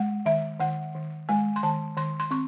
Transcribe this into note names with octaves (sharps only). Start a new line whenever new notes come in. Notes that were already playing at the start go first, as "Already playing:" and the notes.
Already playing: G#3 F#5
D#3 E5
D#3 F#5
D#3
G#3 G#5
C6
D#3 A5
D#3 C6
C6
C4 C#6